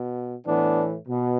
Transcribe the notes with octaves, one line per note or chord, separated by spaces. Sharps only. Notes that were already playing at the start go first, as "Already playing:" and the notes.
Already playing: B2
A2 E3 B3 D4
B2